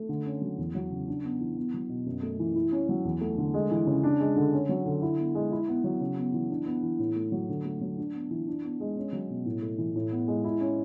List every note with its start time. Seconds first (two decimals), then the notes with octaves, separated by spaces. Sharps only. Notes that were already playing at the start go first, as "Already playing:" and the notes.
Already playing: A3
0.09 D3
0.25 C#4
0.42 F#3
0.58 E2
0.75 F#3
0.91 C#3
1.07 D4
1.24 B3
1.40 E3
1.57 B3
1.74 F#3
1.89 B2
2.06 F#2
2.23 A3
2.39 E3
2.55 E4
2.72 C#4
2.89 F#3
3.05 E2
3.21 A3
3.38 D3
3.54 G#3
3.71 E3
3.87 C#3
4.03 D4
4.20 G#3
4.36 D3
4.53 C#4
4.69 F#3
4.85 D3
5.02 E4
5.19 B3
5.35 G#3
5.52 E4
5.68 B3
5.84 F#3
6.00 C#3
6.17 B3
6.34 E3
6.50 D4
6.66 B3
6.83 E3
6.99 A2
7.16 A3
7.32 F#3
7.49 D3
7.65 A3
7.81 F#3
7.97 D4
8.14 B3
8.31 E3
8.47 D4
8.64 B3
8.80 G#3
8.96 C#4
9.13 F#3
9.30 B2
9.45 A2
9.62 A3
9.78 E3
9.95 A2
10.11 B3
10.28 G#3
10.44 E4
10.61 C#4